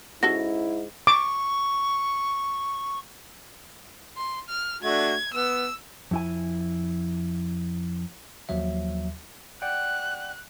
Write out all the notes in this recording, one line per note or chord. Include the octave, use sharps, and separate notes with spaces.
G#2 C#4 E4 F#4 A4 A#6
C#6 D6
C6
F6
A3 D4 F#4 G#6
B3 E6
F2 E4 G#5
D#2 F3 F#3 E5
D5 F#5 G5 F#6